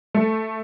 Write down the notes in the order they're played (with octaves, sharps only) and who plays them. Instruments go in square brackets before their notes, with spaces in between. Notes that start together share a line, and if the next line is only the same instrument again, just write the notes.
[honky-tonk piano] A3